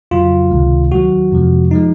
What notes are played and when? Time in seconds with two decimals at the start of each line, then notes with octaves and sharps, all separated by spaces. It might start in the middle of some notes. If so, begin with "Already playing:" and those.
0.11 F2 C#3 F#3 F4
0.51 C#2 C3 D#3 G#3
0.92 D#2 D#3 F#3 F#4
1.32 F2 C3 F3 G#3
1.71 F3 G#3 D#4